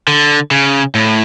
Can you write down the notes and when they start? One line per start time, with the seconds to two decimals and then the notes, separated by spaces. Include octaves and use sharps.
0.08 D3
0.51 C#3
0.95 A2